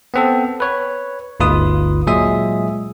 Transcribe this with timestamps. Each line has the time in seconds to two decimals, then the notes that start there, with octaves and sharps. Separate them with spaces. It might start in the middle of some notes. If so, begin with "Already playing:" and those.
0.14 B3 C4 A4
0.60 B4 C#5
1.40 G1 D2 D#4 F4 B4 D#6
2.07 A#2 F#3 G#3 G#4 E5 D#6